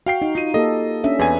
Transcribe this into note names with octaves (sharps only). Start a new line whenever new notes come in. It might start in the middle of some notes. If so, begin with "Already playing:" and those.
F#4 F5 G5 C7
D#4
D#4 F4 D#7
A#3 G4 A4 D#5
C#4 D4 E5
E2 G#4 B4 G#5